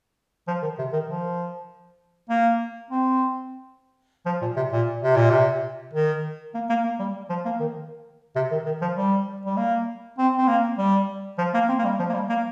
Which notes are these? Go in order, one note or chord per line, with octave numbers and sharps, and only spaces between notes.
F3
D#3
C3
D#3
F3
A#3
C4
F3
A#2
C3
A#2
C3
A#2
C3
D#3
A#3
A#3
A#3
G3
F3
A#3
D#3
C3
D#3
D#3
F3
G3
G3
A#3
C4
C4
A#3
G3
F3
A#3
C4
A#3
G3
F3
A#3
G3
A#3